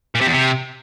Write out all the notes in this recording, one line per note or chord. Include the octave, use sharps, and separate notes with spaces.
A#2
C3
E2
C3